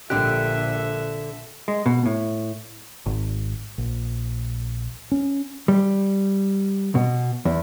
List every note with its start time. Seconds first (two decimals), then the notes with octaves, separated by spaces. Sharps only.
0.10 A#1 D3 G4 A4 E5 F#6
1.68 G#3
1.86 B2
2.06 A2
3.06 G#1
3.78 A#1
5.11 C#4
5.68 G3
6.95 B2
7.45 E2